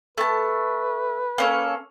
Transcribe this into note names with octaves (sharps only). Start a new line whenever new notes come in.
A3 B4 A5
A#3 C#4 A4